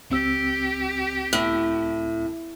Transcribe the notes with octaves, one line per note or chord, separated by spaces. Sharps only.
C#2 C4 G4 E6
A2